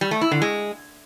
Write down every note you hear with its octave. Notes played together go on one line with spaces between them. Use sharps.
G3
A3
E4
D3
G#3